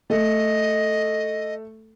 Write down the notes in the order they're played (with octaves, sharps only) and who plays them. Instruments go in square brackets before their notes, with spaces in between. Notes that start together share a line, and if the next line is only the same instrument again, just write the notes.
[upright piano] A3 A4 [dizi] D#5